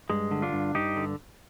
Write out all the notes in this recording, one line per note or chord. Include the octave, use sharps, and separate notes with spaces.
G2 G#3
D3
D4 F4
G2
G2 D#4 G4
D3